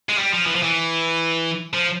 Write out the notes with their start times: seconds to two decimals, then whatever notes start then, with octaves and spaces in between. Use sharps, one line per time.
0.09 G#3
0.18 G3
0.32 F3
0.46 E3
0.55 F3
0.63 E3
1.74 F3